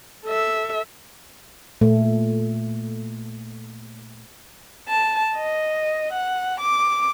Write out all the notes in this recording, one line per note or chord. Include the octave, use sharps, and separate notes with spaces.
A4 E5
A#2 A3
A5
D#5
F#5
D6